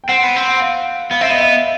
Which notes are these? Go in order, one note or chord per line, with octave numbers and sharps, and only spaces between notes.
G5
C4 F#5
B3
C4
F#5
F5
B3 F5
C4 E5
B3 D#5
E5